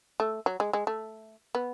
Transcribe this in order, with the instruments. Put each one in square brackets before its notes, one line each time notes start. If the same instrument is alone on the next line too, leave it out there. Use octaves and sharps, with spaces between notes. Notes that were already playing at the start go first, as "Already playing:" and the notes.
[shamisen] A3
F#3
G#3
G#3
A3
B3